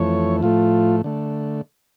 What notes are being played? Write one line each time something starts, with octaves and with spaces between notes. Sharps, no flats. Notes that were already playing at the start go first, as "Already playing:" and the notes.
Already playing: F2 E3 A3 C#5
A2 F3 A3 F4
D3 A3